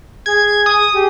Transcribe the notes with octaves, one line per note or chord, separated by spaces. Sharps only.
G#4 G#6
D#6
G4 G#4